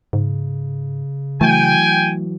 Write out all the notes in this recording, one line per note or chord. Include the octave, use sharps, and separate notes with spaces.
G#2 C#3
E3 F#3 A3 G5 G#5